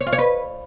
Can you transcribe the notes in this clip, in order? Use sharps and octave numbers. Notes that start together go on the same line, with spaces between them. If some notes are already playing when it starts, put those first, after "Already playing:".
C#5
F4
C#5
B4